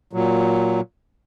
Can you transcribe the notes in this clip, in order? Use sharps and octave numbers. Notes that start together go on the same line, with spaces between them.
A#2 F#3